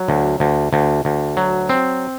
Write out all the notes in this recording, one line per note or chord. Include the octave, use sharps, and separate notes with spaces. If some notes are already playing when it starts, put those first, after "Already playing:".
Already playing: F#3
D2
D2
D2
D2
F#3
C4